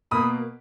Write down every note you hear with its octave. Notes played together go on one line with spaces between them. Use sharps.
B2 A#3 B5 D#6